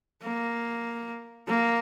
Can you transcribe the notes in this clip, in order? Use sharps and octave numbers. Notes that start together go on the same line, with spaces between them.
A#3
A#3